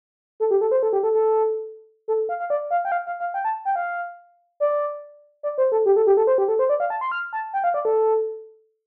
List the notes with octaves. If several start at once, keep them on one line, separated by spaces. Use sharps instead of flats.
A4
G4
A4
C5
A4
G4
A4
A4
A4
F5
F5
D5
F5
G5
F5
F5
F5
G5
A5
G5
F5
D5
D5
C5
A4
G4
A4
G4
A4
C5
G4
A4
C5
D5
F5
A5
C6
F6
A5
G5
F5
D5
A4